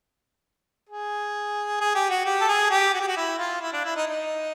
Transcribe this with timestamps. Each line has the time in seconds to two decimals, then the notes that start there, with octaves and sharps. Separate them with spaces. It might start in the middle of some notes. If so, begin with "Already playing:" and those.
0.89 G#4
1.81 G#4
1.95 G4
2.10 F#4
2.26 G4
2.41 A4
2.48 G#4
2.70 G4
2.94 F#4
3.01 G4
3.08 F#4
3.17 E4
3.39 F4
3.62 E4
3.73 D4
3.84 E4
3.96 D#4
4.08 D#4